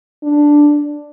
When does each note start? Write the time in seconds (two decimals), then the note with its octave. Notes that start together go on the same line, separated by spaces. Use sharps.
0.23 D4